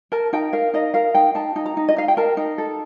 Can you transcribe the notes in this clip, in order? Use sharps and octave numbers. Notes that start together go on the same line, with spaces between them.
A#4 A5
D#4 G5
A#4 F5
D#4 D#5
A#4 F5
D#4 G5
D#4 A5
D#4
A#5
D#4
D#5
D#4 F5
G5
A#4 A5
D#4
A4